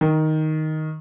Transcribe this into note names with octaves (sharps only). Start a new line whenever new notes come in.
D#3